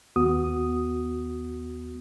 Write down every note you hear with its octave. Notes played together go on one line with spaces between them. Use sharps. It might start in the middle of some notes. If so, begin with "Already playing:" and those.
D#2 B3 F#4 D#6